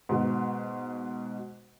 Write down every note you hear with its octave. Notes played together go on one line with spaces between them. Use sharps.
G#2 B2